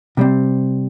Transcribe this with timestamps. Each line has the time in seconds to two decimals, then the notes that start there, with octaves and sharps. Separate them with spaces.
0.17 C3 G3 C4